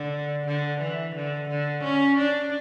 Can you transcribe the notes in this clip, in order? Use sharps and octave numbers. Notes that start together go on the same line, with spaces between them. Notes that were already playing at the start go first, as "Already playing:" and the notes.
Already playing: D3
D3
E3
D3
D3
C#4
D4